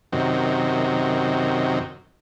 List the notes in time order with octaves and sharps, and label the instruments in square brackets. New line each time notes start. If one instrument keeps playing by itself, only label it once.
[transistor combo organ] F#2 C3 D#3